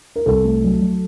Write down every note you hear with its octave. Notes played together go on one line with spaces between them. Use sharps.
A#4
C2 A4
A3
F#3
F#3